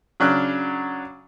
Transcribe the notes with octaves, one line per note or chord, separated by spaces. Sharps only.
C#3 F#3 D4 F6 F#6